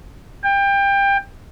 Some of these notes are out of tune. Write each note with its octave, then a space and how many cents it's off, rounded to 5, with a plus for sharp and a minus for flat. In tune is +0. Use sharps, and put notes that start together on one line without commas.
G5 +25